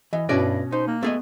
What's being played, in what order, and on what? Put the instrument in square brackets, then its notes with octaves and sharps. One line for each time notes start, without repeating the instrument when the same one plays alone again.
[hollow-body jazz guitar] E3 [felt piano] D#5
[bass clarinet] G2 [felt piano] B2 C#4 A#6 [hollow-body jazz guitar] E4 B4 D5
[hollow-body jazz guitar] D#4 [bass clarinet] C5
[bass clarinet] A#3
[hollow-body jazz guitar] A3 G#4 D#5 [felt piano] B3